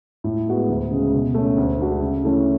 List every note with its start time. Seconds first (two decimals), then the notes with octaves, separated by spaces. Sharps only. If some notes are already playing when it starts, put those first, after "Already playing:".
0.24 A2
0.47 G#3 B3 F#4
0.69 D2
0.91 C#3 G#3
1.13 B2
1.34 A3 C#4
1.57 D2
1.78 D3 G#3 D4 F#4
2.01 C#3
2.24 E3 A3 C#4